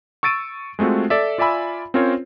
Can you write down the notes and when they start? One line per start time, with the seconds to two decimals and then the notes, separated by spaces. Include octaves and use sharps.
0.23 C#6 E6 A6 D7 D#7
0.79 G#3 A3 C4 F4 F#4
1.10 A4 D5 E5
1.38 F4 D5 E5 G#5 B5 E6
1.94 C4 C#4 F4 A#4 C5 C#5